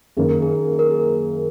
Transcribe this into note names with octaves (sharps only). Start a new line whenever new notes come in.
F#2 D#3 A#3 G#4
A#4
G#4
A#4
G#4